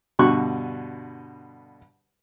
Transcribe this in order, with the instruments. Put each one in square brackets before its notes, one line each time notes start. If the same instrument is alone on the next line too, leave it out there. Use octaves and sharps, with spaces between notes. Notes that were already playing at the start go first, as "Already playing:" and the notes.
[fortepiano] G2 B2 D3 C#6 F#6